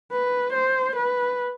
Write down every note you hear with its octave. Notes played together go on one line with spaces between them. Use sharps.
B4
C5
B4